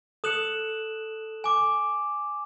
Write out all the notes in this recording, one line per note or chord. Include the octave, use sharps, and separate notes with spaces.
A4 D#6 F#6 C#7 E7 F#7
G#5 D6